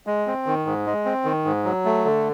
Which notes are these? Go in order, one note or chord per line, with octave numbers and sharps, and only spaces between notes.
G#3
C4
D#3
G#2
G#3
C4
D#3
G#2
F#3
A3
D3